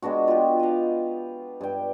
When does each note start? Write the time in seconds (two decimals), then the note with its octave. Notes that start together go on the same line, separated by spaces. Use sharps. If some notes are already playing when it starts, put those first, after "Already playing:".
0.02 G#3 B3 D4 F#4
0.28 F4 G4
0.60 D#5 F5
1.61 G2 G5